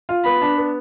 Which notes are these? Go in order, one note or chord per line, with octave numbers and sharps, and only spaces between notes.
F4
B3 B5
D4
B3